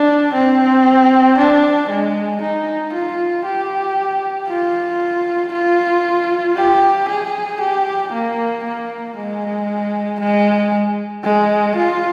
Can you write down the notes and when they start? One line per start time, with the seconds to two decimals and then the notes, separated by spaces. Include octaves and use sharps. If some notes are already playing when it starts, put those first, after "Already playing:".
Already playing: D4
0.33 C4
1.38 D4
1.89 G#3
2.41 D#4
2.93 F4
3.45 G4
4.49 F4
5.53 F4
6.57 G4
7.09 G#4
7.61 G4
8.13 A#3
8.64 A#3
9.17 G#3
10.20 G#3
11.24 G#3
11.76 F4